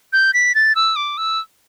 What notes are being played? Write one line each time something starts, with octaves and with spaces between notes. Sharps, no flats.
G6
B6
A6
E6
D6
E6